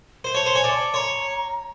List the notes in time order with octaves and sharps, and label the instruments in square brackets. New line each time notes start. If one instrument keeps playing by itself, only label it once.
[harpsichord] C5
[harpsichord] C#5 [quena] A5
[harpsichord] C5
[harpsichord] C#5 [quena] G#5
[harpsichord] D5
[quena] A5
[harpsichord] C#5 [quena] A#5 C6